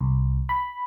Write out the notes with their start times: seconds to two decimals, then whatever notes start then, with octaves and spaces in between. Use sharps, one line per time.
0.01 C2
0.49 B5